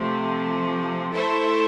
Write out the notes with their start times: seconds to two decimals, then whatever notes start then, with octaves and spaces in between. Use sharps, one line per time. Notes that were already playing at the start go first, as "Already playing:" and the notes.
Already playing: C3 F3 A3
1.11 A3 E4 A4 C5 E5